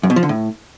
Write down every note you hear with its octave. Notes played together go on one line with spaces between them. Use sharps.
F#2
B2
F3
D3
A2